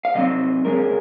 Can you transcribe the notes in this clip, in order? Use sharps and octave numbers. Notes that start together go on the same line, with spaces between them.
F5
C3 F#3 C4 D#5
D#2 C#3 G#3 C#4 A#4